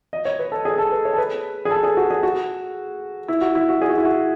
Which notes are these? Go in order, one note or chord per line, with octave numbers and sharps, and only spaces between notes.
D#5
C#5
B4
A4
G#4
A4
B4
C#5
A4
B4
G#4
A4
G#4
F#4
G#4
F#4
E4
F#4
E4
F#4
G#4
F#4
E4
F#4